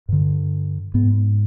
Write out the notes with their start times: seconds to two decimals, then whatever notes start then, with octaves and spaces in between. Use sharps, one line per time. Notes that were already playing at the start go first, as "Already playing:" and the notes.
0.09 G2 D3
0.94 G#2 B3